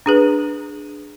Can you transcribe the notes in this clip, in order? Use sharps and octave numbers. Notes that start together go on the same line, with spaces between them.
D4 G#4 B4